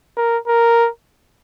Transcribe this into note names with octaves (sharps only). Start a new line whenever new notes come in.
A#4
A#4